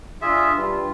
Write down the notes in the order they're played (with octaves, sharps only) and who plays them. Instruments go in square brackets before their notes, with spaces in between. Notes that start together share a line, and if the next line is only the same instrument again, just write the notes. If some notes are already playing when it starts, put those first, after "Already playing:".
[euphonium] D4 [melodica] F4 G#4 E5
[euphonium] G2 [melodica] F4